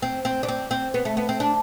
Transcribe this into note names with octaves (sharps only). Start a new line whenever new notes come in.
C4
C4
D4
C4
C4
B3
A3
B3
C4
D4